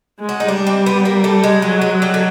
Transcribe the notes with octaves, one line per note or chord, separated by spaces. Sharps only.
G#3
F#4
D#4
G3 D4
C4
B3
A#3
A3
G#3
F#3 G#3
G#3
F#3
G3
D3